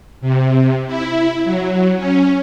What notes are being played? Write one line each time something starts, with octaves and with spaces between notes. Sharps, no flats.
C3
E4
F#3
C#4